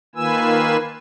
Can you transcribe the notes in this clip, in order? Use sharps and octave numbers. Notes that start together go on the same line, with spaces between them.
D#3 A#3 F4 B4 G#5 E6